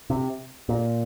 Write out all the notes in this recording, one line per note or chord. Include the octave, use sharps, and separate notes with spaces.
C3
A#2